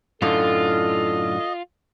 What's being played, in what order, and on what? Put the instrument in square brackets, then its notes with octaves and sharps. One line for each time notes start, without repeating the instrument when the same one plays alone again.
[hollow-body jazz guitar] F#2 A2 D3 [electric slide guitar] F4 [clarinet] A4 [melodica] D#5